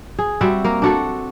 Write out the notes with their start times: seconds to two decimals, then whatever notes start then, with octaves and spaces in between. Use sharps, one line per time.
0.19 G#4
0.41 G3 C4 F#4 E5
0.64 A#3 A#4
0.82 D4 F#4 A4